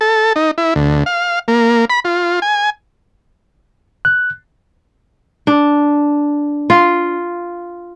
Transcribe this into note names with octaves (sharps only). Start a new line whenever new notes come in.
A4
D#4
E4
D2
F5
A#3
B5
F4
G#5
F#6
D4
F4